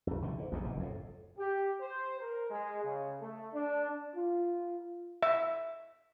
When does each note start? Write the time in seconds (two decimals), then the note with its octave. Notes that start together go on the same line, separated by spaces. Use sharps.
0.07 A#1 F2
0.22 C2 D3 D#3
0.38 G#2
0.51 A#1 E2 A#2
0.64 F#1 B2
0.79 F2 A2
1.39 G4
1.81 C5
2.21 A#4
2.50 G#3
2.84 C#3
3.21 A3
3.53 D4
4.16 F4
5.23 E5